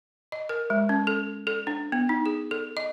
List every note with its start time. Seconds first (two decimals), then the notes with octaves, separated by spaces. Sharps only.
0.32 D#5
0.49 A#4
0.70 G#3
0.89 C#4
1.07 A4
1.47 A4
1.67 D4
1.92 B3
2.09 D#4
2.26 G#4
2.51 A4
2.77 D#5